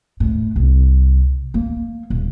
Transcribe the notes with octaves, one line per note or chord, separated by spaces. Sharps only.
A2
C2
A#3
D#1